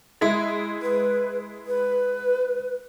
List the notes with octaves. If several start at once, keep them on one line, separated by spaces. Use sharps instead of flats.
G#3 E4
B4
B4